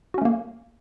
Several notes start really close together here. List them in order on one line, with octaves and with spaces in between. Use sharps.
F#4 C#4 A3 A#3